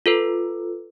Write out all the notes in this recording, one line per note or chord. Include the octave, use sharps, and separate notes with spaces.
F4 A4 B4